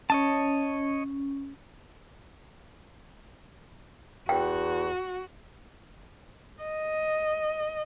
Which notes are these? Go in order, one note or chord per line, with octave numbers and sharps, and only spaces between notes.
C#4 C#5 D#5 A5
E2 F#4 G5
D#5